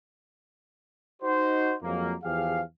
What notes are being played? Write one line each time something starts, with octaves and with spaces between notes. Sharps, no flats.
D#4 F#4 C5
F2 F3 F#3 G#3 A#3
E2 F3 G4 G#4 F5